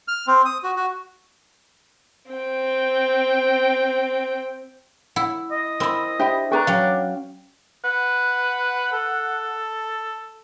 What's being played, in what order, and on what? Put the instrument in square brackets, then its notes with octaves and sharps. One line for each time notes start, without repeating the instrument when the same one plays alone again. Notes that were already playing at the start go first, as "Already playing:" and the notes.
[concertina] F6
C4
D#6
F#4
F#4
[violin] C4 G5
[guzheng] E4 [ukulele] F#5
[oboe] D#5
[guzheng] C4 E4 [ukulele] A#4 B5
[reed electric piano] D4 C5 E5 [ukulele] G4 G5 B5
[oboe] D4 [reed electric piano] G#4 G5 C#6 [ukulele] A4 B4 A#5
[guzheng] F#3 C#4 [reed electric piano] F5 G5
[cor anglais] B4 [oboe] F#5
[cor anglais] A4